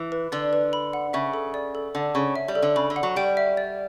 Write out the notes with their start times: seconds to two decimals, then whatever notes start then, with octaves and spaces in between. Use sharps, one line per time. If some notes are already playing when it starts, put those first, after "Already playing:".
Already playing: E3
0.12 B4
0.32 D3 D5
0.53 B4
0.73 B5
0.93 F#5
1.13 C#3 E5
1.34 A4
1.54 D5
1.75 A4
1.95 D3 F#5
2.15 C#3 C#5
2.36 E5
2.48 G3
2.55 A4
2.62 D3
2.76 C#3 B5
2.90 D3
2.96 F#5
3.03 F#3
3.16 G3 G5
3.37 E5
3.57 D5